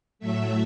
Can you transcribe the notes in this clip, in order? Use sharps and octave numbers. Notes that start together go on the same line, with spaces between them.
A2 F#3 A3 E5